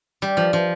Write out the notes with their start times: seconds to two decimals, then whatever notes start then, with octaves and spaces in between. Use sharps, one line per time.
0.22 G3
0.37 F3
0.53 F3